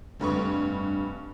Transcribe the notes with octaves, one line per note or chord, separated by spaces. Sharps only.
F1 G2 B4 C#6